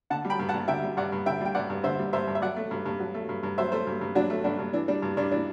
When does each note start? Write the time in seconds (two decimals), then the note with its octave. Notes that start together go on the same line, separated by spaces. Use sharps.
0.10 D3 F#5 A5
0.25 G3
0.30 G5 B5
0.39 G2
0.49 F#5 A5
0.54 G2
0.68 D3 E5 G5
0.82 G3
0.97 G2 D5 F#5
1.12 G2
1.26 D3 E5 G5
1.41 G3 G5
1.55 G2 D5 F#5
1.70 G2
1.84 D3 C5 E5
1.99 G3
2.13 G2 C5 E5
2.28 G2
2.35 E5
2.42 F#3 D5 F#5
2.56 A3
2.71 G2
2.85 G2
2.99 F#3
3.14 A3
3.29 G2
3.43 G2
3.58 F#3 C5 E5
3.72 A3 A4 C5
3.87 G2
4.01 G2
4.15 F#3 D4 F#4
4.30 A3
4.44 G2 D4 F#4
4.59 G2
4.73 E3 D4
4.88 G3 D4
5.02 G2
5.17 G2 D4
5.32 E3 D4